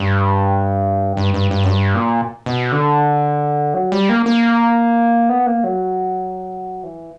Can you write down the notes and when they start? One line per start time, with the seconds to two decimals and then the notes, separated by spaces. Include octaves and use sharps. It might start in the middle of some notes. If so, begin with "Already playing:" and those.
Already playing: G2
1.17 G2
1.34 G2
1.51 G2
1.64 F#2
1.68 G2
1.95 A#2
2.46 B2
2.72 D3
3.74 F#3
3.92 G3
4.09 A#3
4.26 A#3
5.29 B3
5.46 A#3
5.64 F#3
6.83 E3